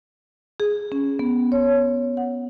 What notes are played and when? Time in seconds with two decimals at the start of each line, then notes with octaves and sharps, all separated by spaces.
0.60 G#4
0.92 C#4
1.19 B3
1.52 C#5
2.17 F#5